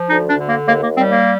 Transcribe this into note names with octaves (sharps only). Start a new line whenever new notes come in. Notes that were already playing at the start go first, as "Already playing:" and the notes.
Already playing: F3
D2 D#4
D4
D3
A#3
D#2 A#3
A#3
G3 C4
A#3